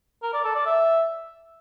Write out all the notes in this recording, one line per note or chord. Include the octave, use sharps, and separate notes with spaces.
A#4
D5
A4
D5
E5